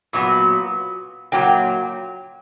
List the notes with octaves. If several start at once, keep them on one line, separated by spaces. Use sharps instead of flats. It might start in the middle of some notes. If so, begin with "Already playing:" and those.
A#2 F#3 B3
A#2 F#3 A#3 G5